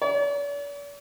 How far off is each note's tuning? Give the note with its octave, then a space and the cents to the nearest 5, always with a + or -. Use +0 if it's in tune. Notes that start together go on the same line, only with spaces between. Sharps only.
D5 -45